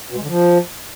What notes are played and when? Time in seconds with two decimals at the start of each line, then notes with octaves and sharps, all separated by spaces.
0.10 B2
0.16 G#3
0.22 D3
0.28 F3